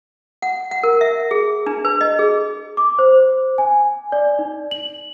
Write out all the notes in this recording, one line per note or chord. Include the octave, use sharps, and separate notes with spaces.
F#5
F#5
A#4
E5
G#4
D4
B4
D#5
G#4
D6
C5
G#5
D5
D#4
F#7